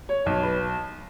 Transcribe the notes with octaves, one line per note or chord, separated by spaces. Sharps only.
C#5
B1 C#5
B4